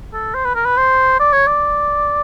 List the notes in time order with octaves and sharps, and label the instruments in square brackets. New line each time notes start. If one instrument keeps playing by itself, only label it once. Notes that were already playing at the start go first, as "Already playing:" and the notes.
[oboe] A4
C5
B4
A#4
B4
C5
D5
C#5
D5